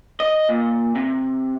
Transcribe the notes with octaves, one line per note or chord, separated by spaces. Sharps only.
D#5
A#2
C3